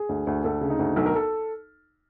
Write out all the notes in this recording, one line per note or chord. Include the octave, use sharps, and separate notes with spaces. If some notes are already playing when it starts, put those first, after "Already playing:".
Already playing: G#4
D2
D2
D2 A4
C#3
D#4
D2
B1 A4
A#4
A4